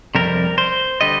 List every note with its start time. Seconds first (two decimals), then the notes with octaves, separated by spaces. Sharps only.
0.15 F2 C3 G3 A#4
0.58 C5
1.01 D3 G3 D#5